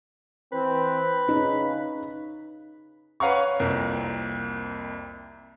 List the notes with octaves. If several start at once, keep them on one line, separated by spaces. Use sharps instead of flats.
E3 C4 B4
C#3 D#4
B4 C#5 F5 F#5 A#5 C#6
C2 F2 A#3 A#4